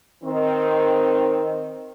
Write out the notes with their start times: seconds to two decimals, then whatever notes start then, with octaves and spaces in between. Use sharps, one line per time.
0.24 D#3 C4